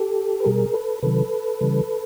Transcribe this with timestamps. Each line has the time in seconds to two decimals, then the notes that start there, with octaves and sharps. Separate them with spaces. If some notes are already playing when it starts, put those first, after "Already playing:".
Already playing: G4 A4
0.40 B4
0.45 B2 G3 G#4 A#4
0.73 A4 B4
1.03 C3 D#3 F#3 A4 B4
1.61 C#3 E3 G3